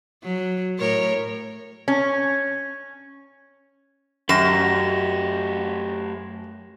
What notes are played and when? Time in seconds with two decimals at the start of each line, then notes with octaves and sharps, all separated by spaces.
0.23 F#3
0.79 A2 A#4 C#5
1.88 C#4
4.29 F#2 A3 G4 A#6 E7